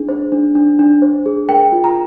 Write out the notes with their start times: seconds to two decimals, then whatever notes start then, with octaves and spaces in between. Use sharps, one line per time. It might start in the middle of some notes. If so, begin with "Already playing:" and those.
Already playing: D4 G#4
0.09 C5
0.32 D4
0.55 D4
0.79 D4
1.02 C5
1.26 G#4
1.49 A#4 G5
1.72 F4
1.84 A#5